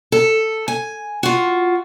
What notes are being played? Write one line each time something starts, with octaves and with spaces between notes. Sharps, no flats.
A4
G#5
F4 F#4